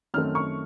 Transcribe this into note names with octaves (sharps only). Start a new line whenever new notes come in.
F#2 D#3 A3 C4 F6
C#6